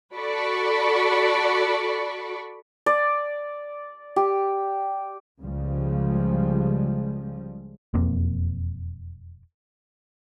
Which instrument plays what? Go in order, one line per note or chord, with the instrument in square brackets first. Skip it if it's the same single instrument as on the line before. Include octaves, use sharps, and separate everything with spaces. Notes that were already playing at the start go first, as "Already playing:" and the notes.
[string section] F#4 A4 D5 B5 C#6
[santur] D5
G4
[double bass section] C#2 C#3 F3 G3 G#3
[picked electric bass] E1 F2 A#3 C4